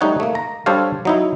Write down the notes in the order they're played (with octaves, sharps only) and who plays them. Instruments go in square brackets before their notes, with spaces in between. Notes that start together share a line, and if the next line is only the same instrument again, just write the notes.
[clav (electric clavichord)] G3 A3 D#4 C#5 F#5
A3 A#3
A#5
G3 D4 A4 C5 C#5 F5
F#3 D#4 E4